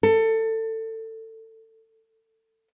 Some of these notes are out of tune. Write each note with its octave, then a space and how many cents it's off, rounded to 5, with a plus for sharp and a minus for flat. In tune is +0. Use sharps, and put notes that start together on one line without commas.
A4 +25